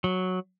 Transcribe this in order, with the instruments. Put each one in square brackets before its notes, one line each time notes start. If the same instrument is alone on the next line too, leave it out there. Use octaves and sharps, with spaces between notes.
[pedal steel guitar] F#3